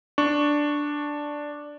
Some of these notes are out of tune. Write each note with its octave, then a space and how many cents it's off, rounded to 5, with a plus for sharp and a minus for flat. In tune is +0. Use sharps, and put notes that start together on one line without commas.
D4 +0 C#6 +0